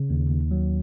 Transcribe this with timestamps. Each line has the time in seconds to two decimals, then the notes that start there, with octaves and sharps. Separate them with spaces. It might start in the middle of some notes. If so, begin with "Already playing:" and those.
Already playing: C#3
0.10 D#2
0.30 D#2
0.51 F#3